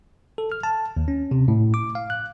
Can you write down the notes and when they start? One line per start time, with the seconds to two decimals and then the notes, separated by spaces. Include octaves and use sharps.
0.38 A4
0.52 F6
0.63 A5
0.97 D#2
1.08 C#4
1.31 C3
1.48 A2
1.74 D6
1.95 F5
2.10 F#6